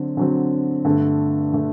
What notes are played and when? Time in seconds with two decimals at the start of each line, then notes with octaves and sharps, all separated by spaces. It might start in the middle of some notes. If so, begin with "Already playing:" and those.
Already playing: D3 F#3 C4
0.17 D3 F#3 C4
0.85 G2 D3 A3
1.53 D3 A3